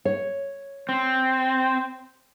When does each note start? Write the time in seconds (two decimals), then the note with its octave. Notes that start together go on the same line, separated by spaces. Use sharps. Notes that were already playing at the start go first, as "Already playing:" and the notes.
0.05 C#5
0.89 C4